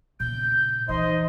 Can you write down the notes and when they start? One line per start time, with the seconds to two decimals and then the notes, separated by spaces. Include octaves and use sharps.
0.20 A#2 C#3 G6
0.89 E3 D#4 C5 D#5 C6